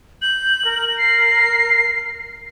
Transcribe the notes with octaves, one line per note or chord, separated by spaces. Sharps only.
G6 F#7
A#4
C7